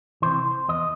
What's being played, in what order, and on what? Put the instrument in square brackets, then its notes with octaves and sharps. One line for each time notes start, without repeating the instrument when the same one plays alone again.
[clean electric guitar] C3 E3 C5
E2 D#5